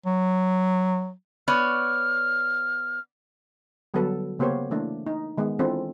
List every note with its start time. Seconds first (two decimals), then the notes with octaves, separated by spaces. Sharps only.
0.06 F#3
1.48 B3 C#5 D5 F6
3.94 D3 F#3 G3 B3 A4 B4
4.39 C#3 A#3 B3 G4 C5 C#5
4.71 E3 A3 A#3 D4
5.06 D#4
5.37 D#3 G#3 B3
5.59 E3 C4 D4 F4 A4